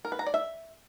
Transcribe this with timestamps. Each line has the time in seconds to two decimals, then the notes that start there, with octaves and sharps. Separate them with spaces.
0.05 A#4
0.12 B4
0.19 A#5
0.26 D5
0.34 E5